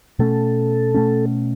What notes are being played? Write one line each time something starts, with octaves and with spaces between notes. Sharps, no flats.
B2 A3 C#4 A4
B2 A3 C#4